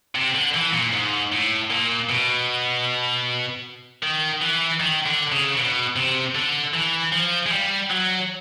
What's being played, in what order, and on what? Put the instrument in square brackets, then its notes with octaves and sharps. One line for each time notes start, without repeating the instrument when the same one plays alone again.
[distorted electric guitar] C3
D3
E3
A#2
G#2
A2
A#2
B2
D#3
E3
D#3
D3
C#3
B2
C3
D3
E3
F3
G#3
G3
F#3